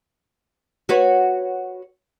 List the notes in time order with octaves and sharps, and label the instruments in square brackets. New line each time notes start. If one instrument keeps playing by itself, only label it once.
[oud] F#4 B4 C#5